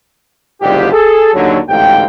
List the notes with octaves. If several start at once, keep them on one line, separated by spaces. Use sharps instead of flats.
F#1 G#2 D3 G3 F4 G4
G#4 A4
D#2 D3 F#3
A1 D2 G#2 G4 F5 G5